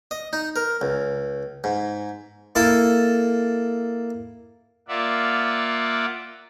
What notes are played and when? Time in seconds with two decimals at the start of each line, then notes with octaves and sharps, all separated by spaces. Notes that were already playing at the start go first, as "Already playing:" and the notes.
0.11 D#5
0.33 D#4
0.56 A#4
0.82 C#2
1.64 G#2
2.55 A#3 E4 A4
4.88 A#3 F4 D5 E5 F#5